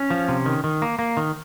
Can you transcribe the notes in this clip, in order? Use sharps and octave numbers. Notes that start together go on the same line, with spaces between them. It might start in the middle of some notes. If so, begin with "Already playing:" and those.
Already playing: C#4
F3
C3
D#3
D#3
A#3
A#3
D#3